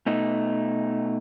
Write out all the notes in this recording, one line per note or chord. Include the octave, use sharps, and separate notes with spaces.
B2 A3 D#4